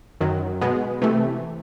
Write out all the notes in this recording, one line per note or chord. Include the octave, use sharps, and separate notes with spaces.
F#2 D#3 F#3
B2 G#3 B3
C3 E3 A3